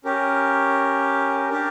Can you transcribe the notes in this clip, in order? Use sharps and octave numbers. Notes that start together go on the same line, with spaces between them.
C#4 G4 A#4
D4 G4 A#4